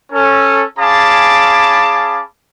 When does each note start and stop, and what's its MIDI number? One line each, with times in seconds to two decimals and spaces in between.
0.13 0.62 61
0.13 0.62 69
0.78 2.21 61
0.78 2.21 68
0.78 2.21 77
0.78 2.21 81
0.78 2.21 83
0.78 2.21 86